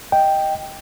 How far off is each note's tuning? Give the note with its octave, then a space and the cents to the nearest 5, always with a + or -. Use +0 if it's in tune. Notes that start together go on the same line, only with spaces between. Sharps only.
D#5 +0 G5 +0